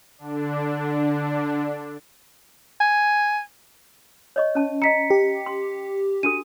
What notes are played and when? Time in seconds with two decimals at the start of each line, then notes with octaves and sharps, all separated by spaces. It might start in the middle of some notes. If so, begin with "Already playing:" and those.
0.18 D3 D4
2.81 G#5
4.36 C#5 D#5 C#6
4.55 C#4 A5
4.82 D#5 A#5 B6 C#7
5.10 G4
5.46 C6
6.23 D4 F#4 A4 D#7